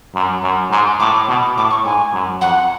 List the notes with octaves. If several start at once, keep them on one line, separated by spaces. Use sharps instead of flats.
F#2
F#2
G#2 G#5
A2 D6
B2
A2 D6
C#6
G#2 G#5
F#2
F2 F#5